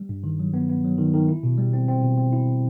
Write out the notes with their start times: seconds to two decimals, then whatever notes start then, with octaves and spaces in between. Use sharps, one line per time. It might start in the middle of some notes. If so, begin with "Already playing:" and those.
Already playing: G3
0.09 G2
0.24 D#3
0.39 F#3
0.54 B3
0.69 B3
0.84 F#3
0.98 D#3
1.13 D#3
1.29 E4
1.43 B2
1.58 G3
1.73 C4
1.88 C4
2.03 B2
2.18 C4
2.32 E4